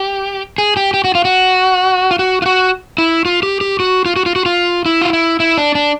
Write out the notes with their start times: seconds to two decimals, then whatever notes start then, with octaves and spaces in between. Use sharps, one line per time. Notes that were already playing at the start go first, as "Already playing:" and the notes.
Already playing: G4
0.58 G#4
0.77 G4
0.94 G4
1.04 F#4
1.15 F4
1.25 F#4
2.11 F4
2.19 F#4
2.42 F4
2.46 F#4
2.98 E4
3.26 F4
3.43 G4
3.61 G4
3.80 F#4
4.06 F4
4.16 F#4
4.26 F4
4.36 F#4
4.46 F4
4.86 E4
5.01 F4
5.13 E4
5.40 E4
5.57 D4
5.75 D4